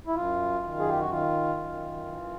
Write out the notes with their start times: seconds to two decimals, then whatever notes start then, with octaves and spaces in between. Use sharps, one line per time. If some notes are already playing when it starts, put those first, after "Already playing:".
0.07 E4
0.15 F#2 F4
0.63 D#3
0.79 G#4
0.89 G4
1.00 F#4
1.10 D#3 F4
1.57 F#2
2.05 E3